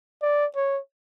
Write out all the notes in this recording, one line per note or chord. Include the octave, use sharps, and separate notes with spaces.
D5
C#5